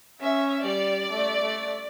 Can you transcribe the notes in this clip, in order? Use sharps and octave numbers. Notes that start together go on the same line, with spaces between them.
C#4 E5
G3 D5
A3
A3